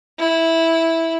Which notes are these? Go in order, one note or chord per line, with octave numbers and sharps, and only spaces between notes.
E4